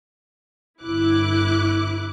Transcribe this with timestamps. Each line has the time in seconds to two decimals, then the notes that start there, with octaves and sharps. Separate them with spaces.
0.82 G1 E4 D6 F#6